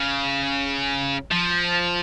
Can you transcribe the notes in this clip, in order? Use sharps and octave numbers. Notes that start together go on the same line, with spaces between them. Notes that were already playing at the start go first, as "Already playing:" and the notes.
Already playing: C#3
F3